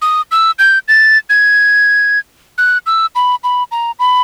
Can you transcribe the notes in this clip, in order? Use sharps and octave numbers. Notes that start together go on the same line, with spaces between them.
D#6
E6
G6
A6
G#6
F#6
E6
B5
B5
A#5
B5